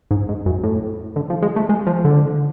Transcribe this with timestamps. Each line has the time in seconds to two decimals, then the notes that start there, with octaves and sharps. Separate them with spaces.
0.11 G#2
0.29 G#2
0.46 F#2
0.63 A2
1.16 D3
1.30 F3
1.42 G#3
1.56 A3
1.69 G#3
1.87 F3
2.05 D3